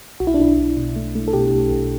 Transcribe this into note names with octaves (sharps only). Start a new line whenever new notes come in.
B1 F#4
E4
D4
B1 E4
B1
B2
A3
A3
A4
B2 G4
B1
B1